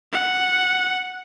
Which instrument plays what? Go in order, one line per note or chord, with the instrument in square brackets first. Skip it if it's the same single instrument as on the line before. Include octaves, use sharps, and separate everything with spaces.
[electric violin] F#5